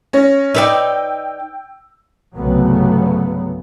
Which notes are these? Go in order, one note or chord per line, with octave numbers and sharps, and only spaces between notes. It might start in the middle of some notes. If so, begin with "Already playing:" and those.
C#4 A#6
D#4 B4 D5 G5 E6
C2 G2 C#3 F#3 A3 B3